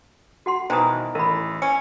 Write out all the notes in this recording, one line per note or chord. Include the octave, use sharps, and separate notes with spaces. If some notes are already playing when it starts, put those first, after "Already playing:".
F#4 F#5 C6
B2 D#3 E3 C5 A#5 D#6
A1 A#4 B5
C#4 C#7